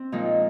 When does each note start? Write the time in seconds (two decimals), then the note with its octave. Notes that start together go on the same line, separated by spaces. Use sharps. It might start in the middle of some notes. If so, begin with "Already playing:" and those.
Already playing: C4
0.12 A#2 F3 G#3 D#4